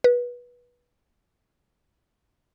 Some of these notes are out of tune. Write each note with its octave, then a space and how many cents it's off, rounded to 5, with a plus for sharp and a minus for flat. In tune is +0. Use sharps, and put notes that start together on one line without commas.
B4 -20